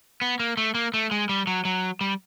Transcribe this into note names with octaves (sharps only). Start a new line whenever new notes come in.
B3
A#3
A3
A#3
A3
G#3
G3
F#3
F#3
G3